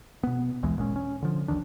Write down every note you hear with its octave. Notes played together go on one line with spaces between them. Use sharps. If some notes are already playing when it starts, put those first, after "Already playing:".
B2 B3
A#1 D#2 E3 G#3
G1 A#2 G#3 C#4
C#4
D3 F3
G#1 D#2 D#3 D4